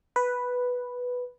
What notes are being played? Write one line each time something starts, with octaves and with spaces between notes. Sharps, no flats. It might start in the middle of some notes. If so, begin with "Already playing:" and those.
B4